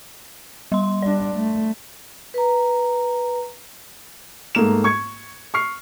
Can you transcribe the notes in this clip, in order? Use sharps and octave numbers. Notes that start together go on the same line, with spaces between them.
G3 C6
G3 D4 D5
A3
B4 A#5
G#2 A3 A#3 E7
C#6 G#6 C#7
C#6 F6 C7